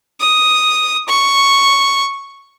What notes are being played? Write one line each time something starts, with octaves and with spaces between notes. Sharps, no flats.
D#6
C#6